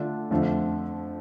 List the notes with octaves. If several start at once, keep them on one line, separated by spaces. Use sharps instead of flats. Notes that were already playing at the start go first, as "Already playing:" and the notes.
Already playing: D3 A3 D4 F4
F2 D3 F3 A3